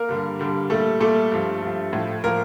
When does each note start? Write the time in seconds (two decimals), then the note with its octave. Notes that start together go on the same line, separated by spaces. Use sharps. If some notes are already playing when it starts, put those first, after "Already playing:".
Already playing: A#3 A#4
0.09 G2 D3 G3
0.39 G2 D3 G3
0.70 A#2 G3 A3 A4
1.00 A#2 G3 A3 A4
1.32 G2 F3
1.62 G2 F3
1.93 A2 F3
2.24 A2 F3 A#3 A#4